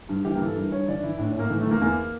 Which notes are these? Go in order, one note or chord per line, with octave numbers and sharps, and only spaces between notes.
G2
E3 G4
A#3
E3
A4
G2 A#4
G2 C#5
E3 D5
D4
E3 E4
A2 D4
C#4
A2 A#3
E3 A3
A3
E3 A#3
E2 A#3